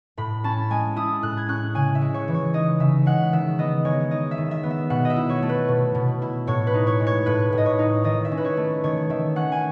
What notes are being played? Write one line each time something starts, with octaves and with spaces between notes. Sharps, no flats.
A2 B5
C#4 A5
G#3 G#5
E4 D#6
A2 F#6
G#6
C#4 F#6
C#3 G#5
E5
G#3
C#5
E3
C#5
D#4 D#5
C#3 E5
G#3 F#5
D#3 E5
B3 D#5
G#3 C#5
D#4 D#5
E5
D#3
E5
B3
E5
B2 F#5
D#5
E5
E4
C#5
A3
B4
B2
B2
E4
A2 C#5
B4
D#4
C#5
G#3
C#5
A2 B4
A2
D#5
C#5
D#4
D#3 D#5
E5
C#4
B4
C#5
A3
D#3 C#5
D#3 E5
C#4 F#5
G#5